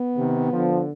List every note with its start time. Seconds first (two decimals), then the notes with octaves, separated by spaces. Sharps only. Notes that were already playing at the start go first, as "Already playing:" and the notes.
Already playing: B3
0.15 C3 D#3
0.52 D3 F3